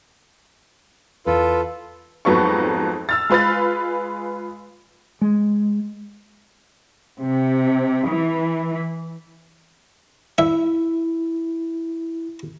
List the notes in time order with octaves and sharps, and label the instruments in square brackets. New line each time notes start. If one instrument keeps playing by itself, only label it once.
[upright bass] E2 E4 [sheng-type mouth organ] F4 A4 [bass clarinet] B4
[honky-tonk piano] F2 G#2 F#3 B3 A4 C#6
E6 F6 A6
G#3 F4 B4 F6 A6
[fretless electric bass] G#3
[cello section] C3
E3
[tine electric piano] E4 [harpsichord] E5